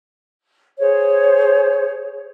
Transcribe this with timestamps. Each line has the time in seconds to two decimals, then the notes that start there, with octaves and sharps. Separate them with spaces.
0.79 G#4 C5 C#5